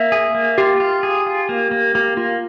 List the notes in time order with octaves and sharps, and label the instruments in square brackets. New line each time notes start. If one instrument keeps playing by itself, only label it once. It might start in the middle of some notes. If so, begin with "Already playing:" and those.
Already playing: [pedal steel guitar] A#3 [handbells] E5
[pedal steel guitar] G#4
A#3
[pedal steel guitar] F4 [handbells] G4
[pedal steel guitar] F4
G#4
F4
A#3
A#3
[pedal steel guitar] A#3 [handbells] G4
[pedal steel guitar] A#3 [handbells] F4